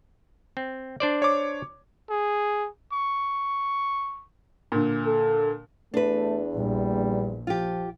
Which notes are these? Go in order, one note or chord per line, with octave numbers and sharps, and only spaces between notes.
C4
D4 C5 D5
C#5 D6
G#4
C#6
A#2 D3
A4
E2 A3 D4 B4
A#1 G3
F3 F4 G4